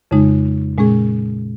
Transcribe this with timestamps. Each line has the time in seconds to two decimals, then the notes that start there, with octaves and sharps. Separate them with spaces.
0.11 F2 C#3 G#3 D#4
0.78 A#2 G#3 C#4 G#4